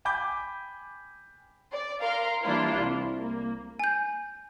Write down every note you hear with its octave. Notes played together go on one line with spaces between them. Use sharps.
G5 G#5 B5 D6 G6
D5
A#4 F5 A#5 C6
E3 G3 A#3 D4 E4 F4
C2
A#3
G#5 G6